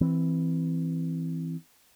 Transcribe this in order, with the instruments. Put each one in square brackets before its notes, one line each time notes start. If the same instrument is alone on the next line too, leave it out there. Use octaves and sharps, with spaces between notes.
[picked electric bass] E3 C4